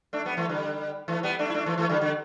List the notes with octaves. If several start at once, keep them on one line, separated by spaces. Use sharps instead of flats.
A3 D4
G3 B3
E3 A3
D3 G3
E3 A3
G3 B3
A3 D4
E4
A3 D4
E3 A3
E3 A3
D3 G3
D3